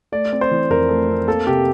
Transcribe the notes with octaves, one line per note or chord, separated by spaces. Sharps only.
A3 D5
C4
C5
E3
F2 A#4
A3
C4
A#3 A4
C3 G4